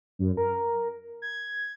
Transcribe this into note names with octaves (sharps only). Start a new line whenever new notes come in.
F#2
A#4
G#6